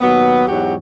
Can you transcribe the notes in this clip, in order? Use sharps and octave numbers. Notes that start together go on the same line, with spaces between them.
D#2 F#3 B3
E2 G#2 F#3 F#4 G4